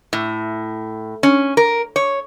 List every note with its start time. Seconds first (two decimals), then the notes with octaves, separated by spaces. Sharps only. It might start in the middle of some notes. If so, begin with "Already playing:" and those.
0.13 A2
1.23 C#4
1.57 A#4
1.96 C#5